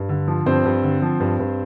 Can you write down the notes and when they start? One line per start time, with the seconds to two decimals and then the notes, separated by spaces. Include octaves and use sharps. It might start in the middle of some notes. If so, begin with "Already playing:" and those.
Already playing: G2
0.09 D3
0.28 F3
0.46 G2 C4 C5
0.65 G2
0.83 D3
1.02 F3
1.20 G2
1.39 G2